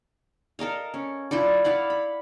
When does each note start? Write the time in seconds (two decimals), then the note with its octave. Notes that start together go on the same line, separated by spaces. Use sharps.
0.59 A4 A#4 D#5 F5
0.94 C#4
1.31 E4 F4 A4 D5
1.64 E4 D5 F5 F#5
1.90 B5